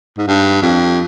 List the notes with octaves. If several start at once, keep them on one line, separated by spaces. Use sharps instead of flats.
G#2
G2
F2